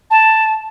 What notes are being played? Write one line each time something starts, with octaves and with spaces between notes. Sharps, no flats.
A5